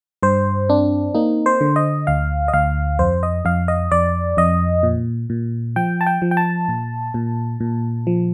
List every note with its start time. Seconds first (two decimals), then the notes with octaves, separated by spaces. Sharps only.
0.23 G2 C5
0.70 C4 D4
1.14 A#3 D#4
1.46 C5
1.61 D3
1.76 D#5
2.07 D2 F5
2.48 D#5
2.53 D2 F5
2.99 F2 C5
3.23 D#5
3.45 F2 F5
3.68 D#5
3.92 F2 D5
4.37 F2 D#5
4.83 A#2
5.30 A#2
5.76 F3 G5
6.01 A5
6.07 G5
6.22 F3
6.31 G5
6.37 A5
6.68 A#2
7.14 A#2
7.60 A#2
8.07 F3